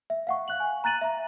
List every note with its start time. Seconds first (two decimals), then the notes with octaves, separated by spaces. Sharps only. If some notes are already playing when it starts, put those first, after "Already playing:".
0.10 E5
0.27 F5 F#5 C#6
0.48 F5 F#6 F#7
0.60 G#5
0.84 A#5 F#6 A6 D#7 F#7
1.01 E5 A#5